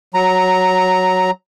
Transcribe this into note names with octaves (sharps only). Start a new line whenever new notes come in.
F#3 A#5